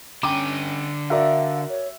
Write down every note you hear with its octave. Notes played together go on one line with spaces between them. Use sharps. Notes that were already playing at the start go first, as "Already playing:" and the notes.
D3 C#4 G5 D6 D#7
F#4 A#4 D5 E5 F5
C#5